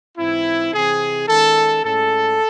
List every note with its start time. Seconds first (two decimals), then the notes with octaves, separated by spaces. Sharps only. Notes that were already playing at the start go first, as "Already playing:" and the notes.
0.17 G#2 E3 C4 E4
0.73 C3 E3 C4 G#4
1.27 D#3 G#3 C#4 A4
1.83 A2 G#3 C#4 A4